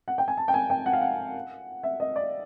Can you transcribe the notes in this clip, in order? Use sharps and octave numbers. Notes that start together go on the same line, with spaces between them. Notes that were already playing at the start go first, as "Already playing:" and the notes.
F#5
G5
G#5
A5
G5
G#5
G5
F#5
F5
F#5
E5
D#5
D5